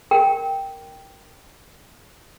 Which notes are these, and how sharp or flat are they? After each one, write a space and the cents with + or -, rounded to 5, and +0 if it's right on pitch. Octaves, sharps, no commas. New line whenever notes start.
A#4 -5 G5 +0